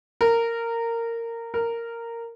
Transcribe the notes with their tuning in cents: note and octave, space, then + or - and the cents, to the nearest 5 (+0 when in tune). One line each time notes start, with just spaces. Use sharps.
A#4 -15
A#4 -10